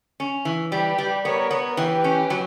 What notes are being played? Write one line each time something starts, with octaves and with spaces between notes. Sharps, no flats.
C#4
E3
G3 G4 B4
G3
B3 A#4 C#5
B3
E3 G4 B4
C#4
F#3